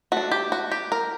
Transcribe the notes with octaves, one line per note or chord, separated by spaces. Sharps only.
A3 D4 F#4
G4
F#4
G4
A#4